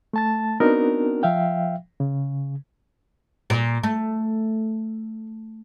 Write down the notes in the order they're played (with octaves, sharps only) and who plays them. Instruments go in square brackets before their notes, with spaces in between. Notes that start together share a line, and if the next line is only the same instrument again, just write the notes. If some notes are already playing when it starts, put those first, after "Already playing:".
[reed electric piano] A3 A5 A6
B3 C4 D4 D#4 F#4 A#4
F3 E5 F5 G5
C#3
[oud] A#2
A3